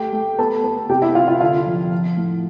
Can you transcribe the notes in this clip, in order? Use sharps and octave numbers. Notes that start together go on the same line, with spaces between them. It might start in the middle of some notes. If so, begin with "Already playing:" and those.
Already playing: A3 G4 G5
A3
B3 A4 A5
B3
C3 G4 G5
E4 E5
C3 F4 F5
F4 F5
D3 F4 F5
F3
F3
A2